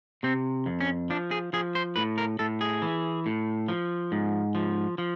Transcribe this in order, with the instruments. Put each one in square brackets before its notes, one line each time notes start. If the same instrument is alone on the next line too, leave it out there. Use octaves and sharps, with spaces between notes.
[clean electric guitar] C3 C4
F2
C#4
F3 D4
G#4
F3 G#4
C5
A2 B4
A#4
A2 A4
G#4
E3
A2
F3
G#2
F3
F3